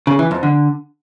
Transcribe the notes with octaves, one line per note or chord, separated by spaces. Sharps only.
C#3
E3
F2
D3